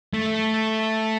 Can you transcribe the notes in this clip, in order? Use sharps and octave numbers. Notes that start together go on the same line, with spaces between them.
A3